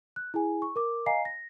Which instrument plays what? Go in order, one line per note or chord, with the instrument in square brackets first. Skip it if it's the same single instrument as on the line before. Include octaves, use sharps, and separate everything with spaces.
[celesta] F#6
E4 G#4 G#5
C#6
A#4 D6
D#5 F5 G#5 A#5 C7
A#6